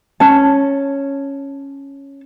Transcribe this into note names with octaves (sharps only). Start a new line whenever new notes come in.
C#4 A5